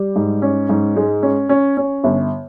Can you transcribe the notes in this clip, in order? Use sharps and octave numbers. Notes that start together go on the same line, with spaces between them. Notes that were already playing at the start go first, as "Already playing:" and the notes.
Already playing: G3
G#2
C#4
G#2
G#3
C#4
C#4
C#4
G1